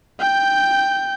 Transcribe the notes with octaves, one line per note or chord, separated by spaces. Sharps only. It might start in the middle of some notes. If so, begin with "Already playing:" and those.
G5 G6